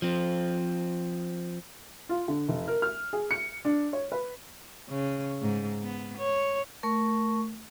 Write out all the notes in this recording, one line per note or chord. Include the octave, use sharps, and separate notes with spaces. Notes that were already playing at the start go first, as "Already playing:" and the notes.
F3 C4
F4
D3
F1
A#4
F6
G#4
C#7
D4
C#5
B4
C#3
G#2
B3
C#5
A3 A#4 C#6